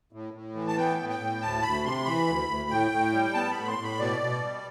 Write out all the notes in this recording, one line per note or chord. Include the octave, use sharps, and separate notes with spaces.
A2
A2
E3
A5
B3 G5
A2
G5
A2
D2 A5
D2 B5
C3 C6
E3 B5
D2
D2
A2 G5
A2
G3
B3 A5
A2 B5
C6
A2
B5
B2 D5
B2
G3